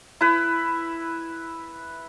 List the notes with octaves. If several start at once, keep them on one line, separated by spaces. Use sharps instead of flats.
E4 B4